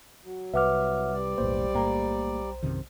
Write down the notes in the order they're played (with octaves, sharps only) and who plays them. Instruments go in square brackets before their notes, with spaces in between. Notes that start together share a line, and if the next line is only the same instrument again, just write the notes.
[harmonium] F#3
[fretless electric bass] C2 [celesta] B4 D6 [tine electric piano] E5 F#5 F6
[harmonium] G3 D5
[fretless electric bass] E1 A2 A#3 [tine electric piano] B1 C5
[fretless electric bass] A2 A#3 [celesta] G5 A#5
[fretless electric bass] F#2 C3 D#3